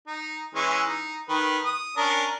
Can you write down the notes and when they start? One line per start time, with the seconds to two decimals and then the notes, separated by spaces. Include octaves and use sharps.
0.07 D#4
0.55 E3 G#3 C#4
0.87 D#4
1.29 D#3 B4
1.65 D#6
1.97 C#4 D4 A#4